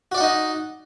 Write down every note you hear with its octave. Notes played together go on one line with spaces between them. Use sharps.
D#4 F#4 D5 D#5 F#5